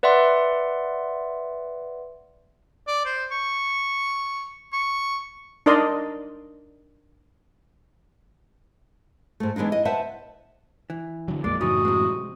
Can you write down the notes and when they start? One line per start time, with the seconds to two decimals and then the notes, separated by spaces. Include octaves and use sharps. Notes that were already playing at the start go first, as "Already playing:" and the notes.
0.03 B4 D5 E5 F#5 C6
2.87 D5
3.06 C5
3.32 C#6
4.73 C#6
5.66 D4 D#4 A#4 D5 D#5 C6
9.40 G#2 A3
9.56 E3 G#3 B3 D4 D#4
9.72 D#5
9.85 B4 C5 E5 F#5 A5
10.90 E3
11.28 D3 F#3
11.44 A#1 F2 G#3 A#3 D5
11.61 F#2 A2 C#3 E3 C#4 D#4 F#4 D#6
11.85 C3 G#3